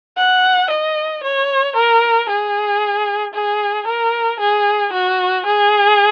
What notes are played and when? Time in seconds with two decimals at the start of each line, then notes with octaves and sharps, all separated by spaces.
0.17 F#5
0.70 D#5
1.23 C#5
1.76 A#4
2.29 G#4
3.34 G#4
3.87 A#4
4.40 G#4
4.93 F#4
5.46 G#4